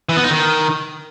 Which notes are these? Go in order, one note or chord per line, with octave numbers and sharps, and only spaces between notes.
E3
B3
D#4
D#3